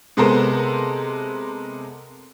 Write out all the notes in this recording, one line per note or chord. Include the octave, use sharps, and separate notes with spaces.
C3 G#3 B3 A4 A#4 C5